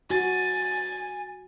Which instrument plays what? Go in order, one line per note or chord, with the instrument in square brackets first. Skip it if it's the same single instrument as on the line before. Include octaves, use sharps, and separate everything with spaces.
[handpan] F#4 [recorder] G#5 [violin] A6